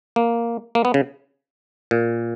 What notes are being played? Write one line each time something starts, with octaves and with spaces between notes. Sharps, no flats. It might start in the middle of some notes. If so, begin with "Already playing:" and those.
A#3
A#3
B3
C#3
A#2